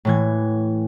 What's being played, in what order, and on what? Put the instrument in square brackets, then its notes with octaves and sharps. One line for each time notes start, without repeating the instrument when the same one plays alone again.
[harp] A2 E3 G#6